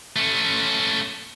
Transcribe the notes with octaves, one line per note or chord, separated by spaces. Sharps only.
A3 C#4